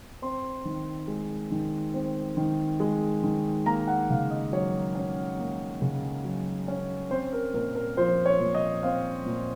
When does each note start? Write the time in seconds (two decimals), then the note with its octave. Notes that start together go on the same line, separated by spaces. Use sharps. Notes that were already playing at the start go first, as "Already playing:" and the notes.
0.22 C4 C6
0.65 D#3
1.08 G#3
1.51 D#3
1.94 C4
2.37 D#3
2.80 G#3
3.23 D#3
3.66 A#3 A#5
3.87 F#5
4.10 C#3 F5
4.30 D#5
4.52 F#3 C#5
4.95 C#4
5.39 A#3
5.82 C#3
6.24 F#3
6.68 C#4
7.11 C4 C5
7.33 A#4
7.54 A#2 A#4
7.75 A#4
7.97 F3 C5
8.25 C#5
8.40 A#2
8.55 D#5
8.83 C4 F5
9.26 A#2